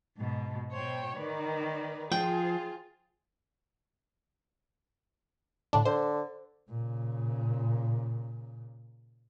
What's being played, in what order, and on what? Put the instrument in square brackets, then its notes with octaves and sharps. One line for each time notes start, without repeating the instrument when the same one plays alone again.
[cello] G#2 B2
[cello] B2 C#5 [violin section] C5 G5
[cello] D#3 [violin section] A#4 B4 D5
[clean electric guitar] F3 [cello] F4 [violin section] G#4 C5 [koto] G5
[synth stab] A2 D3 D4
[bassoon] D3 [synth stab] C5
[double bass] A#2 C#3